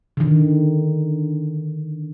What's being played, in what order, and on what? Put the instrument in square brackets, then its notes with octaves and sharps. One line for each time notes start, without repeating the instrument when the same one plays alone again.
[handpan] D3 D#3